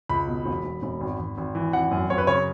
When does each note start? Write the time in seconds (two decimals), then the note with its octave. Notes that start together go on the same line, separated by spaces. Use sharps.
0.09 C#2 B5
0.27 B2
0.46 E1
0.64 E1
0.83 E1
1.01 G#1
1.19 G#1
1.38 G#1
1.55 E3
1.73 G#1 F#5
1.91 F#2
2.10 F#2 C#5
2.18 B4
2.27 C#3 C#5